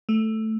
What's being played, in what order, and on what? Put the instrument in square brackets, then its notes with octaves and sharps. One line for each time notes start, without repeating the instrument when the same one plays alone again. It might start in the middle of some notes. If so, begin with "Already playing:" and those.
[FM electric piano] A3